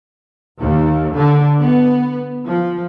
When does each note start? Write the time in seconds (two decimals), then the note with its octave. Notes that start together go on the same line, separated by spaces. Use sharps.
0.58 D#2
1.13 D3
1.60 B3
2.46 F3